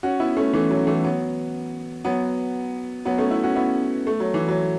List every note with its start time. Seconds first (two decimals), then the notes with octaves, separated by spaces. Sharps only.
0.03 C#4 F#4
0.20 B3 E4
0.37 A3 C#4
0.53 E3 A3
0.70 F#3
0.87 E3 A3
1.04 F#3 B3
2.05 F#3 B3
3.05 F#3 B3
3.18 A3 C#4
3.31 B3 E4
3.43 C#4 F#4
3.56 B3 E4
4.07 A3
4.20 F#3
4.34 E3
4.48 F#3